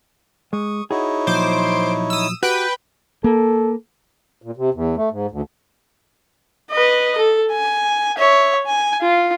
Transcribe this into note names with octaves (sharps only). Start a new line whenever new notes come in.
G#3 C#6 D#6
D#4 E4 F#4 G#4 C#5
A#2 F3 F#3 C5 D6
D#6 E6
F#4 G4 B4 G5
A#3 A4
A#2
C3
E2
A3
G#2
D2
B4 D#5
A4
G#5
C#5 E5
G#5
F4